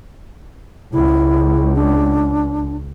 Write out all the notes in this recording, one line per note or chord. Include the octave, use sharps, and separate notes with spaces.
C#2 E4
D4